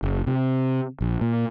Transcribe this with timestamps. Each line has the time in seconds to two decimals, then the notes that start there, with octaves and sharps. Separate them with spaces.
0.03 F#1
0.27 C3
1.01 A#1
1.21 A#2